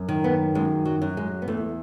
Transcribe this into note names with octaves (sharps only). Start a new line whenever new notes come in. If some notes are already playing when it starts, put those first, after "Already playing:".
Already playing: F#2
D#3
B3
F#2 G#3
F#3
F#2
G#3
B3
E2 A3